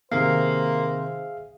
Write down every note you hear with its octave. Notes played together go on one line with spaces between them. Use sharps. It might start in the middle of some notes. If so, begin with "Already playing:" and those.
C3 D#3 A#3 G#4 C5 E5 F5